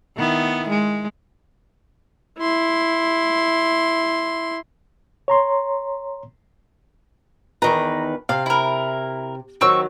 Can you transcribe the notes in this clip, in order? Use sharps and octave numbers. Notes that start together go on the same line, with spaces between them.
D#3 B3 E4
G#3
E4 C6
C#5 A#5 C6
E2 D#3 B4 A#5
C3 F5
E4 A#4
D#3 F#3 C4 C#6 E6